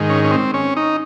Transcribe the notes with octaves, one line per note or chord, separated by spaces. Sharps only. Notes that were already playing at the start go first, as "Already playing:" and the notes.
Already playing: G#2 D#3
C#4
C#4
C4
C#4
D#4